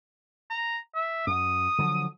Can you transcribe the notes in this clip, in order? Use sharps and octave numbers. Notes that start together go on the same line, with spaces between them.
A#5
E5
F#2 D#6
D3 F3 F#3